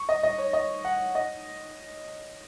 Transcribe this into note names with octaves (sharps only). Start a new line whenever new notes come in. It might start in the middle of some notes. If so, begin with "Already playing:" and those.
Already playing: C#6
D#5
D#5
C#5
D#5
F#5
D#5